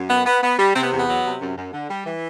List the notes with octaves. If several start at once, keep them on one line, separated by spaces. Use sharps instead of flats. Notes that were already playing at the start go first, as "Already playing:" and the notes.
Already playing: F#2
B3
B3
B3
G3
C3 C4
B3
E2
B3
F#3
C3
F#2
F#2
D3
G3
E3